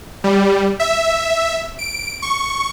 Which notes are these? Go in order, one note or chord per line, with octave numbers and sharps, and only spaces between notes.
G3
E5
D7
C#6